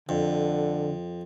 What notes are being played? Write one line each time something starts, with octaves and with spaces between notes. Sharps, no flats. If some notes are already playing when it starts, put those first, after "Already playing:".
F2 D3